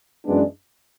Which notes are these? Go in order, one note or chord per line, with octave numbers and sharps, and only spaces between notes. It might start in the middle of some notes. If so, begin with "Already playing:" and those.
F#2 E3 G#3 B3 D4